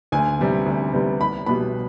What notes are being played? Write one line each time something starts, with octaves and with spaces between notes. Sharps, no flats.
D2 G#5
C3 G3 B3
D2
C3 G3 B3
C2 B5
B2 G3 B3 B5